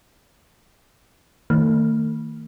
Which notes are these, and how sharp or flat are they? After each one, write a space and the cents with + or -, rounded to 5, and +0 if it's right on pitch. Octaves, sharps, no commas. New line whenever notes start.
D#3 +20 A3 +40